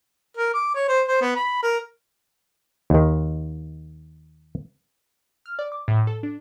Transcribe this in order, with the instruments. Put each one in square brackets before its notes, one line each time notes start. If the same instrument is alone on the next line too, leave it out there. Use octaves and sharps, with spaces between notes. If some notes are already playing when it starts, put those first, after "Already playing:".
[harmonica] A#4
D6
C#5
C5
C5
B3
B5
A#4
[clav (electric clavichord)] D#2 D#3
[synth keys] F6
D5
D6
A2
A4
D4